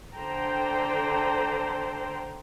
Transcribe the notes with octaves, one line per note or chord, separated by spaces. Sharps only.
D3 A4 C5 G5 A#5